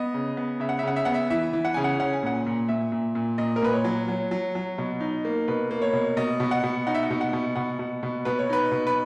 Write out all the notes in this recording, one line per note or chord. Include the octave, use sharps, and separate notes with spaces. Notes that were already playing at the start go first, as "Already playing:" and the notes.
Already playing: B3 D#5
C#3
B3
C#3 E5
F#5
E5
C#3 F#5
E5
B3 F#5
E5
E3 E5
E3
F#5
C#3 G#5
F#5
C#4 F#5
G#5
A#2 F#5
A#2
A#2 E5
A#2
A#2
A#2 D#5
A#4
A#2 B4
C#5
F#3
F#3
F#3
F#3
B2
D#4
A#3
B2 B4
A#3
C#5
B2
B2 D#5
B2
F#5
B2
D#4 F#5
E5
F#5
B2
F#5
B2
B2 F#5
B2
B2
B2 B4
C#5
D#4 B4
B2
B4